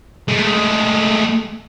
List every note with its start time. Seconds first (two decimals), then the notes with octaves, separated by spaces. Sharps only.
0.28 G#3 A3